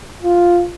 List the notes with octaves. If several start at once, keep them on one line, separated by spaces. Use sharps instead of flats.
F4